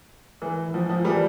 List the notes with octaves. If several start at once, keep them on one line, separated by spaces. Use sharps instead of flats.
E3
F3
F3
E3 G3